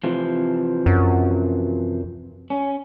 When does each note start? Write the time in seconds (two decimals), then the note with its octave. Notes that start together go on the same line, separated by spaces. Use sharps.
0.04 C3 E3 F3
0.86 F#2
2.50 C#4